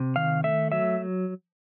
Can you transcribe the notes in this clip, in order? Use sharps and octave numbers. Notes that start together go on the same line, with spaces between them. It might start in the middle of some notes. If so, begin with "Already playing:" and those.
Already playing: C3
D#3 F5
A3 E5
F#3 E5